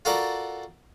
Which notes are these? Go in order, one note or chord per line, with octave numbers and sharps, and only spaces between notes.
F4 F#4 A4 A#4 D5 F#5